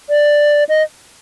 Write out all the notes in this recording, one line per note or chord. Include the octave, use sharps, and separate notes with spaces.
D5
D#5